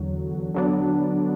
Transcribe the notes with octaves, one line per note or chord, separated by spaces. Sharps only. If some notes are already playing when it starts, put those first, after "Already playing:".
Already playing: E2 D3 F#3
D3 F#3 B3 D4